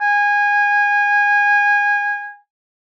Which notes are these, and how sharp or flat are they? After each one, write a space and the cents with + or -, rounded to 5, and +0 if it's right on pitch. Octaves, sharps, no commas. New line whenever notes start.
G#5 -20